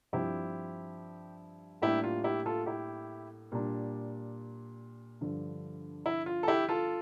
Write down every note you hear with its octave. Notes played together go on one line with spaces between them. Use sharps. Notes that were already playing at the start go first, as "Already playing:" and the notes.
G2 F3 C4 E4 G4
A2 G3 A#3 D4 E4 G4
F4
E4 G4
F4 A4
E4 G4
A#2 G3 D4
G2 D3 F3
E4
F4
A4
E4 G4
F4 A4